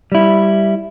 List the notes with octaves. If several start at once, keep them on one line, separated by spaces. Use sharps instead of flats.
G3 E4